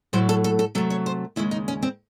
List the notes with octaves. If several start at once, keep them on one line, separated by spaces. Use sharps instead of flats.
A2 F#3 A3 C5
A4
A4
A4
C3 F#3 A3 A4
C#5
C5
D#2 C#3 G#3 E4
D#4
C#4
C4